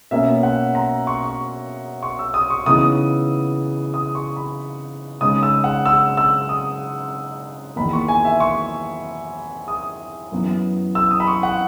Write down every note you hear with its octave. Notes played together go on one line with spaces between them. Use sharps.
B2 A#3 C#4 E5
F#5
A#5
C#6
C#6
C#6
E6
D#6
C#6
C#3 E3 B3 D#4 D#6
D#6
C#6
B5
C#3 G#3 D#4 D#6
E6
F#5
E6
E6
D#6
E2 D#3 A#3 B5
C#6
G#5
E5
C#6
D#6
F#2 E3 B3 E4
E6
D#6
B5
C#6
F#5